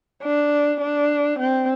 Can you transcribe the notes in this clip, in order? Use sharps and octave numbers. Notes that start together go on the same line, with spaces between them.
D4
D4
C4